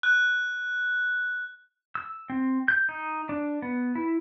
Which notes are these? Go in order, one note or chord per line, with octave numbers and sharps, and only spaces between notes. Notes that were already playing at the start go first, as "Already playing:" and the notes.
F#6
E6
C4
G6
D#4
D4
B3
E4